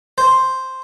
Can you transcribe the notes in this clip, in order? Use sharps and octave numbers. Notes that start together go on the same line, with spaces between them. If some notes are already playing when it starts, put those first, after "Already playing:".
C5